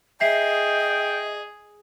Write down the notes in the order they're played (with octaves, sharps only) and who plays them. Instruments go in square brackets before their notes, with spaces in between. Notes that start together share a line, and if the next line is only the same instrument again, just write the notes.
[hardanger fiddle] G#4 [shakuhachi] D#5 [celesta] E5 B6 C7 [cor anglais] G5